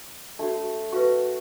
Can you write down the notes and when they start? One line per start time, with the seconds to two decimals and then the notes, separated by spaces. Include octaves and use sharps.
0.39 A3 D4 F#4
0.92 F#4 B4 F5 C#6